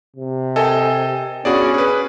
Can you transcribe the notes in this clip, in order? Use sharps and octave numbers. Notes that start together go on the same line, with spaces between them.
C3
A4 A#4 D#5 E5 G5 G#5
B3 C#4 D4 F#4 G#4 D5 B5
G#4 B4 F#6